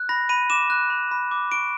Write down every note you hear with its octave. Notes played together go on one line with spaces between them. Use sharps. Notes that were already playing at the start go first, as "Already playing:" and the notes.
Already playing: F#6
B5 A#6
B5 D#7
D6 E7
F#6
B5
B5
D6
C#6 D7